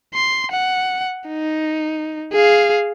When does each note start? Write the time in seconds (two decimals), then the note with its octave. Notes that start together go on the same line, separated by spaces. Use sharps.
0.15 C6
0.52 F#5
1.28 D#4
2.33 G#4 F5